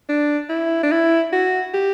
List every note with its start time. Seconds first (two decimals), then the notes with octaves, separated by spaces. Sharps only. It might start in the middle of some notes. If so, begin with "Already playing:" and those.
0.09 D4
0.49 E4
0.83 D4
0.91 E4
1.33 F#4
1.74 G4